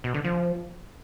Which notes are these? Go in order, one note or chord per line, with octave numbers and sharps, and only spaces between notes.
B2
D3
F3